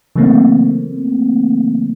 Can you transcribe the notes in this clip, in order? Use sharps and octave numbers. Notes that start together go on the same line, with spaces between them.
C#3 E3 F#3 A3 A#3 C4